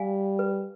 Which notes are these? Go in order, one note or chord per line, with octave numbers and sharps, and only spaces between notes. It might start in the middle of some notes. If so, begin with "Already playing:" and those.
Already playing: G3 F5 G#5
B4